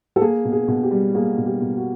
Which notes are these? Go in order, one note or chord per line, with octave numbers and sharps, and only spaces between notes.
A4
A#3 G#4
B2
G#4
B2
G4
G3
A#3 G#4
B2
G4
B2
F#4